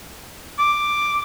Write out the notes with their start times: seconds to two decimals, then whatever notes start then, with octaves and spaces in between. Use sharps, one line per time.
0.58 D6